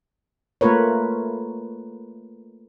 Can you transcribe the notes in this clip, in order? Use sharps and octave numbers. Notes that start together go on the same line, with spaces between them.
A3 A#3 F4 A#4 B4 C#5